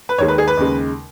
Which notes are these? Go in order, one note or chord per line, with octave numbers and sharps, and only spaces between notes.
B4
D#2 D#3 G#3 C#5
B4
G#4
B4
D#2 C#3 G#3